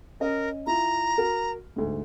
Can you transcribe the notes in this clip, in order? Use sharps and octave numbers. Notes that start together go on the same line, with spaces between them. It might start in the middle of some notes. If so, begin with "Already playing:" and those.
C#4 A#4 D#5
E4 F4 A#5
F#4 A#4
D2 G#2